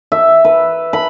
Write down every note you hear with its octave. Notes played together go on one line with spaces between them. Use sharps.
E5
B4
B5